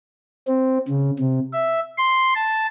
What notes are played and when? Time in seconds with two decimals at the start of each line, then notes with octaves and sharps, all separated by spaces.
0.47 C4
0.88 C#3
1.19 C3
1.53 E5
1.98 C6
2.35 A5